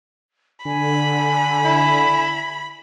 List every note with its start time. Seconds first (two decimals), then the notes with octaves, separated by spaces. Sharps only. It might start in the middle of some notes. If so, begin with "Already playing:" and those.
0.65 D3 G#5 B5
1.65 E4